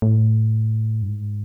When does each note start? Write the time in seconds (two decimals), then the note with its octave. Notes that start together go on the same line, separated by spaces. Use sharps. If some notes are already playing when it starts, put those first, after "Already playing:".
0.02 A2
1.02 G2
1.09 G#2